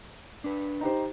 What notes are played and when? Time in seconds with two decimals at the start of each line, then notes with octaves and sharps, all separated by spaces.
0.44 D4 B4
0.81 D#4 G4 C5